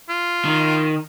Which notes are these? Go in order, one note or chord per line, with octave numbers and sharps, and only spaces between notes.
F4
D#3